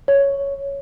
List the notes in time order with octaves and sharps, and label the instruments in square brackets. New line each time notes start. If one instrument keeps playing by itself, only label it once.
[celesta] C#5